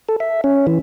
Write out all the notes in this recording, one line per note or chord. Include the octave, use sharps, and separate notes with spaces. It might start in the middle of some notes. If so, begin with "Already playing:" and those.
A4
E5
C#4
E3